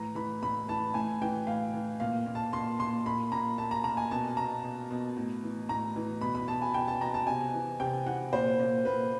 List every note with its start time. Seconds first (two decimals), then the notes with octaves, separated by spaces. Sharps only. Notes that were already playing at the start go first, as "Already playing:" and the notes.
Already playing: A2 E3 A#5
0.15 E3 B5
0.43 A2 B5
0.68 E3 A5
0.94 A2 G#5
1.22 E3 G5
1.47 A2 F5
1.74 E3
2.00 A#2 F5
2.26 A#2
2.35 A5
2.53 A#2 C6
2.79 A#2 C6
3.06 A#2 B5
3.32 A#2 A#5
3.58 A#2 A5
3.71 A#5
3.84 A#2 A#5
3.97 G#5
4.11 B2 A5
4.37 B2 A#5
4.64 B2
4.91 B2
5.17 A2
5.43 E3
5.69 A2 A#5
5.96 E3
6.21 B2 B5
6.35 B5
6.48 B2 A5
6.62 G#5
6.74 B2 G5
6.88 A5
7.01 B2 A#5
7.14 A5
7.27 C3 G#5
7.54 E3
7.80 C3 G5
8.06 E3 F#5
8.33 A#2 C5
8.59 A#2
8.85 A#2 B4